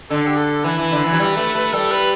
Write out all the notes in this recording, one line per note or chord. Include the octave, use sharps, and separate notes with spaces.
D3 A4
G4
A4
E3 B4
E3
D3
E3
F#3
G3
A3
A3
G3 A4
B4